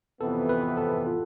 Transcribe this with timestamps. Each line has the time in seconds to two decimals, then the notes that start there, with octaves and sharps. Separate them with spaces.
0.20 F2 C3 E3 B3 A4
0.49 B4
0.77 A4
1.06 F4